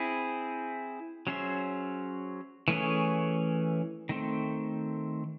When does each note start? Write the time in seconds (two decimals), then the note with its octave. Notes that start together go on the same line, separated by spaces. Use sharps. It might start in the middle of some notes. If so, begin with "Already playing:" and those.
Already playing: C4 E4 G#4
1.27 F#3 C#4 G#4 C5 E5
2.68 E3 A3 C#4 G#4 C#5
4.09 D#3 A3 C4